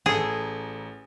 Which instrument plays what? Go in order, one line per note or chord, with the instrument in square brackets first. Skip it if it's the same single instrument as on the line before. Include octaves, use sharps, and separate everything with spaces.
[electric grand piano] A1 A4 [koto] G#4